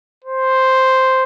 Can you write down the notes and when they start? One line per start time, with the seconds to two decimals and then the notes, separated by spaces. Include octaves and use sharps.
0.24 C5